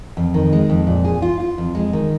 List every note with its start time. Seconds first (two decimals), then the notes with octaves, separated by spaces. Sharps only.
0.17 F2
0.34 D#3
0.53 G#3
0.70 F2
0.87 A#2
1.04 G#4
1.22 F4
1.40 F4
1.58 F2
1.75 G#3
1.93 D#3